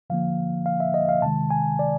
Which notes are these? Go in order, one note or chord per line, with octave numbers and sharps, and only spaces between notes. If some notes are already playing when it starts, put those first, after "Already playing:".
D3 F3 A#3 F5
F5
E5
D#5
F5
C3 D#3 G#3 A5
G#5
D5